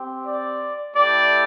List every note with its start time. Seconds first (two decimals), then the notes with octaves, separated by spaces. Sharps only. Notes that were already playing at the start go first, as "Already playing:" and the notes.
Already playing: C4 G4
0.26 D5
0.95 A3 E4 G4 D5